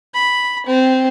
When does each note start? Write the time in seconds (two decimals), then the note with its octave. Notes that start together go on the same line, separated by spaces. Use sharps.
0.14 B5
0.66 C4